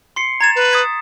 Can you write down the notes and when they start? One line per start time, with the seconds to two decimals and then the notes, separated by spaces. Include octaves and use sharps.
0.16 C6 C7 C#7
0.41 A#5 G#6 A6 E7
0.56 B4
0.71 D#6 G#6 B6